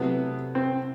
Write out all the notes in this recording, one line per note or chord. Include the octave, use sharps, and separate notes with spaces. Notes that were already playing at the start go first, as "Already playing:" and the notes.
Already playing: C3 F#3 A3 B3 E4
C4